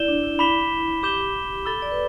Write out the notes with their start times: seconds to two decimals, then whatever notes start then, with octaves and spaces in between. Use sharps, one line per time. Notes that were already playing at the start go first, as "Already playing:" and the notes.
Already playing: E4 D5 G6 E7 G7
0.08 D4
0.24 E4
0.39 B5 D6 B6 E7 G7
1.03 G4 D6 G6 E7 G7
1.54 G4
1.66 A4 B5 E6 A6 G7
1.82 D5
1.92 B4